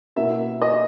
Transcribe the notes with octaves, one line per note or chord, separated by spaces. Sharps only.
B2 A#3 C#4 E4 E5
D#5